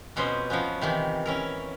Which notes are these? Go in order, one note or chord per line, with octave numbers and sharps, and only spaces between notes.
F2 B2 C#4 C5 D#5 C6
F3 F#3 B3 C#4
C3 D#3 E3
C#4 E4 A#4